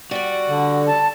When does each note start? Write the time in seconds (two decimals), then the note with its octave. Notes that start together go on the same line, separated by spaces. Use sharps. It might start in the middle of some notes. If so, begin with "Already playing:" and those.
0.11 G3 F#4 D5
0.49 D3
0.86 A5